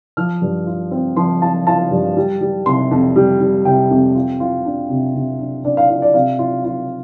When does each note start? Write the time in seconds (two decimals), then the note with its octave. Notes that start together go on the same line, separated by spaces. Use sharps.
0.17 F3 F6
0.42 G2
0.67 F4
0.91 C4
1.16 F3 C6
1.41 F4 A5
1.67 F4 A5
1.91 G2
2.17 G3
2.41 G3
2.66 C3 C6
2.91 F2
3.16 G3
3.41 G3
3.65 C3 G5
3.91 F2
4.15 F4
4.40 F4
4.65 D4
4.89 C3
5.15 C3
5.39 D4
5.65 D4 D5
5.77 F5
5.89 F4 F5
6.02 D5
6.14 C3 F5
6.39 F4
6.64 F4